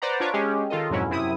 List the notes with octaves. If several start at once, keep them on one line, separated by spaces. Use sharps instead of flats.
B4 C5 D5 F#5 A#5
D4 F4 B4 C#5 C#6 D6
G#3 C#4 G4 G#4
D#3 F4 A4 D#5
F2 G#2 B2 F#3 C#4 E4
F#2 C3 E4 D#6